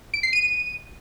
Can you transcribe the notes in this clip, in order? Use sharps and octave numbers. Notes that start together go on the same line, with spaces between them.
D7
C7
D#7